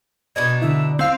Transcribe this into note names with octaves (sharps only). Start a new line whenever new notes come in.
B2 D4 D#4 G#6
D3 E4 E5
C4 F5 E6